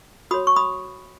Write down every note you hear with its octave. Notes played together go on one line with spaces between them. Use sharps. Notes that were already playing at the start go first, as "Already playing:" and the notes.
F#4 C#5 B5 D#6
C#6
B5 D#6